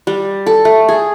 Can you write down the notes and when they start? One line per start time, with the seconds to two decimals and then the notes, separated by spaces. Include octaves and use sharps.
0.07 G3
0.47 A4
0.65 A3
0.89 G#4